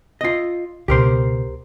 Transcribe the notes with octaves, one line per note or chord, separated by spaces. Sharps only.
F4 D#5
C#2 B2 G4 A#4 C5